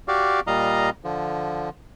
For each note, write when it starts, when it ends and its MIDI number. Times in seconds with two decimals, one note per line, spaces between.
0.08 0.40 66
0.08 0.40 67
0.08 0.40 74
0.08 0.40 77
0.47 0.90 46
0.47 0.90 55
0.47 0.90 75
0.47 0.90 77
0.47 0.90 82
1.04 1.69 50
1.04 1.69 53